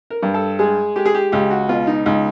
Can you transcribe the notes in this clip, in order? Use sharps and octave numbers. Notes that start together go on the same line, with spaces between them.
A#4
G2
A4
G#3 G#4
G#3 G4
G#4
G4
C#2 G4
F#4
B2 F4
D#4
C#2 D#4